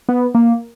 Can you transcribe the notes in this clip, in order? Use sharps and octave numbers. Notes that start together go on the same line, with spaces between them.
B3
A#3